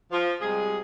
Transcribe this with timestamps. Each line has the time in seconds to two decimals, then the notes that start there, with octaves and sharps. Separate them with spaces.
0.11 F3
0.41 C3 G3 G#3 G#4